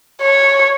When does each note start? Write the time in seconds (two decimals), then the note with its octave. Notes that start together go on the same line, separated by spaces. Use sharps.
0.21 C#5